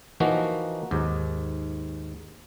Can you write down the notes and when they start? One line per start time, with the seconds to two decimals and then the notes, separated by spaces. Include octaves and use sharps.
0.20 E3 F3 A#3 D#4 F#4
0.91 D#2 G#2